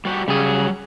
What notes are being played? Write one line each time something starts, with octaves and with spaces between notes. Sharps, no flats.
G3 F#4 G4
C#3 F#3 G3 G#4